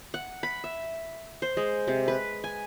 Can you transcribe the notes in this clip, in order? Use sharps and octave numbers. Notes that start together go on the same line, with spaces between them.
F#5
B5
E5
C5
G#3
C3
B4
G#5